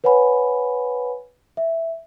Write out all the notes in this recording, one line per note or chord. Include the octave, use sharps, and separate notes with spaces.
B4 C#5 F#5 G#5 B5
E5